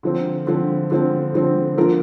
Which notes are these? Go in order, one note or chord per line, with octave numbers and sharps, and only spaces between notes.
D3 F3 C4
D3 F3 C4
D3 F3 C4
D3 F3 C4
D3 F3 A#3 F4 A#4